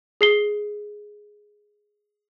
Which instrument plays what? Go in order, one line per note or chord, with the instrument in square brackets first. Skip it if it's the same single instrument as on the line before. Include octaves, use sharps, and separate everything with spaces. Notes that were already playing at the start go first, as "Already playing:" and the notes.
[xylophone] G#4 C7 G7